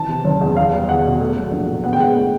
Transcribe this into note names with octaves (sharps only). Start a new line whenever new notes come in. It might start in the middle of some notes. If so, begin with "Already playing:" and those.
Already playing: E3 A5
C3
F#1
E2
E2 F5
G3
E2 F#5
B2
A3
F#3
A#1
A2
B3 F#5
G5
G#3 F#5
A2